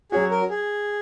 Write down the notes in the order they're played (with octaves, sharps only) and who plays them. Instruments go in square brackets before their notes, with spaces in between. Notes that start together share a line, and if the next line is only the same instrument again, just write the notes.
[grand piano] F#3 C#4 F#4 [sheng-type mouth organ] G#4
[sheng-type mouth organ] A#4
G#4